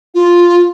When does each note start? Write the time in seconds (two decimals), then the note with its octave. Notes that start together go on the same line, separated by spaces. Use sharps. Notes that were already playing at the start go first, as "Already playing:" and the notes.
0.14 F4